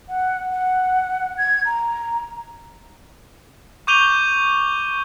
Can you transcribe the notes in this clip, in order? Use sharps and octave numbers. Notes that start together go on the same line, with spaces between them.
F#5
F#5
G#6
A#5
C#6 D6 G6 D#7 F7 G7